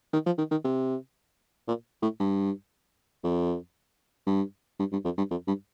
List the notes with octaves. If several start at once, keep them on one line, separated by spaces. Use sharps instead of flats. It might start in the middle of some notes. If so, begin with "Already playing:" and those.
D#3
F3
D#3
D#3
C3
A#2
A2
G2
F2
G2
G2
G2
F2
G2
F2
G2